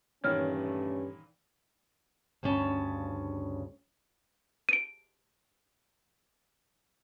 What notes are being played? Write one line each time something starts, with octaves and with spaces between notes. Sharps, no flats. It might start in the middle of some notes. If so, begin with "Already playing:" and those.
G2 A#2 D#3 E3 A3 C#4 C#5 F6
D2 G2 C#3 C#4 A5
D7 D#7